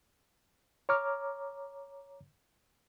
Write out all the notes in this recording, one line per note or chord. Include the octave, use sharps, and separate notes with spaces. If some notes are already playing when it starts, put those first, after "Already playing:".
C#5 A#5 D6 F6